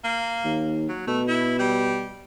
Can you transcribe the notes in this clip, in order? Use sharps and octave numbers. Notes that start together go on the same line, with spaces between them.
A#3
D#2
F#3
B2 A3
E4
G3